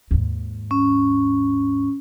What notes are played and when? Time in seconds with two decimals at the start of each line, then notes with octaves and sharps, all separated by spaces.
0.11 D#2 G#2
0.71 C#4